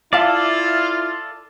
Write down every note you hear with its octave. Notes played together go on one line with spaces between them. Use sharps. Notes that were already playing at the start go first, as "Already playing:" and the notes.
E4 F4 A4 D5 E5 F5 A5